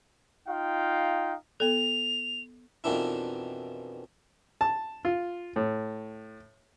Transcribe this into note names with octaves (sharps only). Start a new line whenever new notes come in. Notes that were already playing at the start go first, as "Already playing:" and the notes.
D#4 F4 F5 G5
B3 A4 F7
F2 B2 D#3 E3 D4 E4
A5
F4
A2